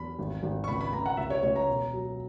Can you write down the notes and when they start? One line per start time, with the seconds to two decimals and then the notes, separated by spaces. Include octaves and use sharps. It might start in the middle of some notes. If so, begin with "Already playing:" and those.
Already playing: E2 B5
0.19 G#1
0.43 G#1
0.64 C#6
0.68 C#2 B5
0.81 B5
0.92 C#2 A#5
1.06 F#5
1.17 C#2 E5
1.30 C#5
1.43 C#2 C#5
1.56 A#5
1.68 E1
1.93 F#3